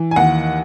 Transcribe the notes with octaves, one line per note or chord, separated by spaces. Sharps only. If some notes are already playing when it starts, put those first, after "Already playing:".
Already playing: E3
G#5
D#2 F#5